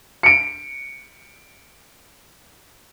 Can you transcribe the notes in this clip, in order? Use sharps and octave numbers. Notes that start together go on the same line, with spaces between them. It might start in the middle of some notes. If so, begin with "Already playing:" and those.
C#7 D7